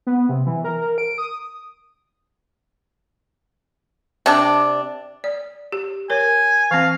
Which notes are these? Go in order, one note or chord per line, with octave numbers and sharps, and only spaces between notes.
B3
C3
E3
A#4
A#4
D7
D#6
C3 D4
D5
G4
A#4 C#5 G#5
E3 C4 F5